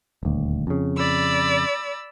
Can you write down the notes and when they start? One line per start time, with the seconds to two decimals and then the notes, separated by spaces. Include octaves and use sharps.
0.23 D#1 D2
0.67 F2 C#3
0.97 D5 B5 E6